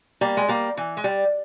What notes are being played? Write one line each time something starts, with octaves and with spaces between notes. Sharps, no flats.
G3 A#3
G#3
G3 A#3
E3
G#3
G3